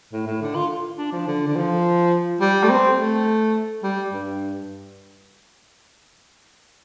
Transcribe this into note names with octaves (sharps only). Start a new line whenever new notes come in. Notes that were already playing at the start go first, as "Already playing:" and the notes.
A2
A2
D3
F4
D4
F3
D3
D3
F3
G3
A3
C4
A3
G3
G2